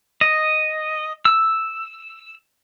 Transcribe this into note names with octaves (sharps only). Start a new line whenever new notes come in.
D#5
E6